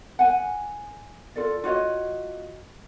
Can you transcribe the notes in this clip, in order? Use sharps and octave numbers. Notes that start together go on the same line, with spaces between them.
F#5 G#5
F4 A4 D5
F4 F#4 C#5 D#5